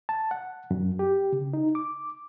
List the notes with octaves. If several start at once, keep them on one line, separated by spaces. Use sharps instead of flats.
A5
F#5
F#2
G4
C#3
D#4
D6